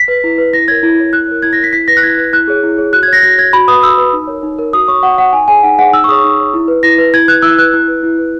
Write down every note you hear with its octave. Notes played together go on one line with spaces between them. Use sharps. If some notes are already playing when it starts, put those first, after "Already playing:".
Already playing: B6
B4
E4
B4
E4 A#6
A#4 C#5 G#6
E4
A#4 C#5
E4 F#6
A#4 C#5
E4 G#6
A#6
A#4 C#5 B6
E4 B6
B4 A#6
F#6
E4 G#6
B4
E4 F#6
G#4 C#5
E4
G#4 C#5
F#4 F#6
G#6
C#5 A#6
F#4 A#6
C#5 G#6
F#4 B5
B4 D#6
F#4 E6
B4
D#4
A#4 C#5
D#4
A#4 C#5
F#4 D#6
C#5 C#6
F#4 F#5
C#5 F#5
D#4 G#5
G#4 C#5 G#5
D#4 F#5
G#4 C#5 F#5
D#4 E6
C#6
G#4 C#5 D#6
D#4
G#4 C#5
E4
B4
E4 A#6
B4
E4 G#6
B4 F#6
E4 E6
B4 F#6
E4
B4
E4
B4